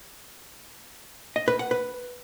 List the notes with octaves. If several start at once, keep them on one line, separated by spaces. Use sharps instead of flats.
D#5
B4
F#5
B4